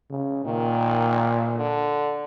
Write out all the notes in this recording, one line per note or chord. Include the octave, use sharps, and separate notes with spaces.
C#3
A#2 D#3
D3